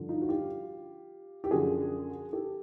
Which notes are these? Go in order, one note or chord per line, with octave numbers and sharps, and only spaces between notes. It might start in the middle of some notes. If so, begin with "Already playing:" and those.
Already playing: G2 D3 F3
D#4 F4
F#4
F4 G4
G4
F#2 D3 F3 F#4 G#4
G4 A4